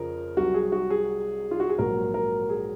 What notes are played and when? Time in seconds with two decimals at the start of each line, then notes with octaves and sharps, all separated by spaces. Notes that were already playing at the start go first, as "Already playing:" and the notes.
Already playing: F2 C#3 F3 A#4
0.37 C2 C3 F#3 F#4
0.54 G#4
0.72 F#4
0.90 G#4
1.51 F4
1.60 F#4
1.69 G#4
1.78 A#1 G#2 F#3 A#4
2.14 A#4
2.49 G#4